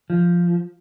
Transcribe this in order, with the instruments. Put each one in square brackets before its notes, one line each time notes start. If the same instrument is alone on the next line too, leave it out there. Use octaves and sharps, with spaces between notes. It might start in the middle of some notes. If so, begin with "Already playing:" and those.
[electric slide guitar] F3